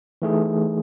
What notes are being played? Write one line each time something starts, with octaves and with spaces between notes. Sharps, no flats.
E3 A3 D#4 G#4